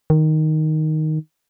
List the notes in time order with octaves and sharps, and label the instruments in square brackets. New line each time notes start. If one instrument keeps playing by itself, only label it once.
[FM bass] D#3